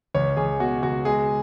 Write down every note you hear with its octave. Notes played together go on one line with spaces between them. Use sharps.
C#2 C#5
C#2 G#4
B2 F#4
C#2 F#4
G#3 G#4